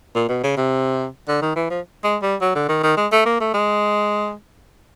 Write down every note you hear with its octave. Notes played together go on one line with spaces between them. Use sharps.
A#2
B2
C#3
C3
D3
D#3
E3
F3
G#3
G3
F#3
D3
D#3
D#3
G#3
A3
A#3
A3
G#3